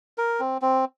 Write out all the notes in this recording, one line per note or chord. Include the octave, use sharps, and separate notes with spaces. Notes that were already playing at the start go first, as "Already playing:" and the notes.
A#4
C4
C4